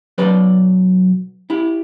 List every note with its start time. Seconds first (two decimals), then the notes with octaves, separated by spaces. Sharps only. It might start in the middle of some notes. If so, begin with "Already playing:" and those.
0.18 B1 B2 F#3 B4 D5
1.50 E4 G4